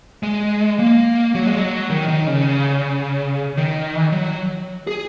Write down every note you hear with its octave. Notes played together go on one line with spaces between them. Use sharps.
G#3
A#3
F#3
G#3
F#3
D#3
D#3
C#3
D#3
F#3
G#4